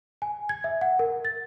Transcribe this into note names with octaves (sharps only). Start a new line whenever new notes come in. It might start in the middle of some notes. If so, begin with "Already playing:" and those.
G#5
G#6
E5
F#5
A#4
A6